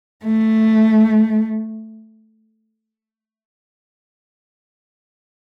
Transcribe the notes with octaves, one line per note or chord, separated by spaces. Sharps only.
A3